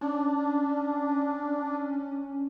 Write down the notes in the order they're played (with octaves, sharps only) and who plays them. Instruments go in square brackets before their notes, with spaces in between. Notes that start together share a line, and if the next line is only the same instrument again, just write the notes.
[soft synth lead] C#4 [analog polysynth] D4